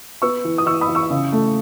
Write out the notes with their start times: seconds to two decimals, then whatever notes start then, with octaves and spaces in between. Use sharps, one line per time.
0.22 B3 C#6 E6
0.44 E3
0.58 D#6
0.66 E3 C#6 E6
0.81 B5 D#6
0.88 E3
0.95 C#6 E6
1.10 C#3
1.32 A3